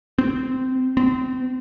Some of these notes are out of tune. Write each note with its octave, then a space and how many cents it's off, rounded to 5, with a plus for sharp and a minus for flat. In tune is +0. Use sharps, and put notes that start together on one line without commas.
C4 -15
C4 -30